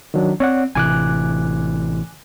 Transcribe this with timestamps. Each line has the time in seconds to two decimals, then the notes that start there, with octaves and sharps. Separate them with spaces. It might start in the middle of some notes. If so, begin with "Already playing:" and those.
0.14 D#3 F#3 D4
0.40 C4 C#5 D5 F#5
0.75 A1 C3 E3 G#5 D6 F#6